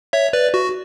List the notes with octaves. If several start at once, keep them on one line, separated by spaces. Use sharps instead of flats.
C#5 E5
B4 D5
F#4